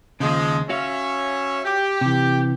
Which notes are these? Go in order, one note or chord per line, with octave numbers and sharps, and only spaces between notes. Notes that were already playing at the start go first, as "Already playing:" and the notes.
D#2 C#3 F3 G#3
C#4 F#4 C#5 E5 F5
G4
C3 E3